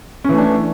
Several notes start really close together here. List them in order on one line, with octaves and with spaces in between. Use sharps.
C#4 E3 A3 D4